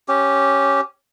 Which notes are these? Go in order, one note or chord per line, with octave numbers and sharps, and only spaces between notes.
C#4 G4